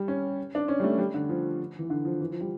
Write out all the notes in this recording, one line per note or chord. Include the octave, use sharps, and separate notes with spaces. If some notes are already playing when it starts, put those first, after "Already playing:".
Already playing: G3
C#4
D4
C#4
G3
A3
G3
D3
F3
E3
D3
F3
E3
F3
G3